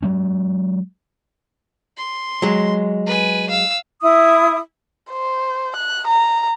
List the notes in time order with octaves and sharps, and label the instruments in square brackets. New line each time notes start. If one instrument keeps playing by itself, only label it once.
[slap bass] F#3 G#3 C#4
[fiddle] C6
[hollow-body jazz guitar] F#3 G#3
[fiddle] B4 G#5
F5 E6
[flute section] E4 D#6
[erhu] C5
F#6
A#5